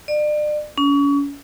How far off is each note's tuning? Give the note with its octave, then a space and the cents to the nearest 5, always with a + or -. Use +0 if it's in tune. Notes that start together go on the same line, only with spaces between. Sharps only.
D5 +35
C#4 +35